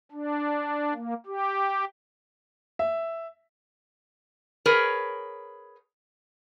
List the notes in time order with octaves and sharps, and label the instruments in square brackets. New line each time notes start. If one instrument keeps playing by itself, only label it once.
[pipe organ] D4
A#3
G4
[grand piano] E5
[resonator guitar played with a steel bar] G#4 A#4 B4 C#5